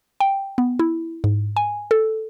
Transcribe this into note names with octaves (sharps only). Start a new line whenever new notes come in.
G5
B3
E4
G#2
G#5
A4